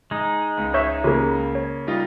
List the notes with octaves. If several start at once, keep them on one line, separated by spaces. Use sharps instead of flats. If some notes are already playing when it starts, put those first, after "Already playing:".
G#3 D#4
C#2
C#5 E5 C#6 G6
C#3 A#3 F4 G4 C#5
C#5
G3 D#4 F4